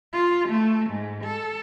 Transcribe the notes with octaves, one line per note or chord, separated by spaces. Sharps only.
F4
A3
G#2
A4